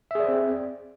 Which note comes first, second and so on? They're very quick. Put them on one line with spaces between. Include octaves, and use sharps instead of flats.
E5 G#4 D5 C5 C4